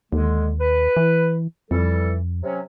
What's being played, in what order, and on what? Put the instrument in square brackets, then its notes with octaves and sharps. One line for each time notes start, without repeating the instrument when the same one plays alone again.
[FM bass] D#2 [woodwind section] D3 G#3
[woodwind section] B4
[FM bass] E3
[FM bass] F2 [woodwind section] E3 G3 A4
[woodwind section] C3 F#3 C#4